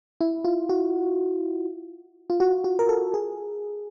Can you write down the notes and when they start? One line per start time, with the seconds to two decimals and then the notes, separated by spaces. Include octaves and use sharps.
0.21 E4
0.45 F4
0.69 F#4
2.30 F4
2.40 F#4
2.64 F#4
2.79 A#4
2.89 A4
3.14 G#4